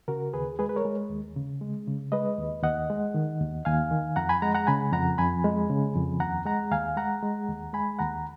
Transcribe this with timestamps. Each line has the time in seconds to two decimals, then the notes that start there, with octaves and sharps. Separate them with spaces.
0.08 C#3 F#4 A#4
0.33 D#2 G#4 B4
0.59 G#3 G#4 B4
0.69 B4
0.76 A#4 C#5
0.85 G#3
1.10 D#2
1.36 C#3
1.61 G#3
1.87 C#3
2.12 G#3 B4 D#5
2.38 D#2
2.63 D#2 D#5 F#5
2.90 G#3
3.14 D#3
3.40 D#2
3.65 D#2 F5 G#5
3.91 D#3
4.16 F2 F#5 A#5
4.29 G#5 B5
4.42 G#3 F#5 A#5
4.55 F#5 A#5
4.67 C#3 G#5 B5
4.93 F2 F#5 A#5
5.18 F2 G#5 B5
5.44 G#3
5.70 C#3
5.95 F2
6.20 D#2 F#5 A#5
6.46 G#3 F#5 A#5
6.72 D#2 F5 G#5
6.97 G#3 F#5 A#5
7.23 G#3
7.49 D#2
7.73 G#3 G#5 B5
7.99 D#2 F#5 A#5